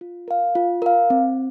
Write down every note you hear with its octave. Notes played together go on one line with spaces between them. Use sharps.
F4
A#4 F5
F4
A#4 F5
C4